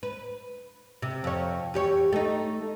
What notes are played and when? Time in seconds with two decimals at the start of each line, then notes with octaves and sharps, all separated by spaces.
0.03 B4
1.02 C3
1.24 F2 C#5
1.74 E2 G4 C#5
2.13 A3 D#4